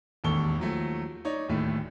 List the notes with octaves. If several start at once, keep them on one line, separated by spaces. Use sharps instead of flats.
E1 A1 D#2 A4 C#6 G7
D#2 F3 F#3 A3
D#4 C#5 D5
D1 D#2 A2 A3